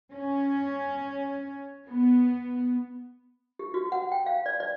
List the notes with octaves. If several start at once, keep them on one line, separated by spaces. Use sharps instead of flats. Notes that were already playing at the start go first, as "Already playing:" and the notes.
C#4
B3
G4
F#4
F#5
G5
F5
D5
D5